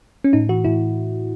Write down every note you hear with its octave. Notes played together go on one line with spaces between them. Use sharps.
C#4
A2 D#4
E3 F#4
A2 E4